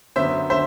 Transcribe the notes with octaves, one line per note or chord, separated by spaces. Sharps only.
F#2 D3 F#3 B3 C5 E5
D3 C5 E5